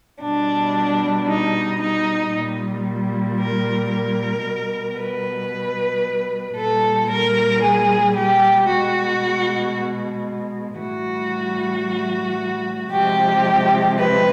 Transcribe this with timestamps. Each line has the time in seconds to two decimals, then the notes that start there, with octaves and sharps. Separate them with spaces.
0.22 B2 G3 D4
1.28 D#4
1.81 D#4
2.33 A#2 G3
3.40 A#4
3.92 A#4
4.45 B2 G3
4.98 B4
6.57 A#2 G3 A4
7.10 A#4
7.63 G#4
8.15 G4
8.69 B2 G#3 F#4
10.80 A2 E3 G3 F#4
12.92 C3 F3 G#3 G4
13.97 B4